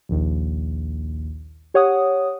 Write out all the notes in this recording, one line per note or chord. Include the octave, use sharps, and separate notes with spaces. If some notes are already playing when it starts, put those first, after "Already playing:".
A#1 D#2
G4 C#5 F#5 D#6